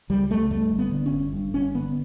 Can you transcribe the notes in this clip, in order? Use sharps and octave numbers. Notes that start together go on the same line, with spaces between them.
C#2 G3
C#2 A3
G2 A3
G1
B3
D3
C#4
G1
G2
G1 C#4
D3 B3